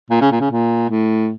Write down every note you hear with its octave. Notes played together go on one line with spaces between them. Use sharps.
A#2
C#3
A#2
C#3
A#2
A2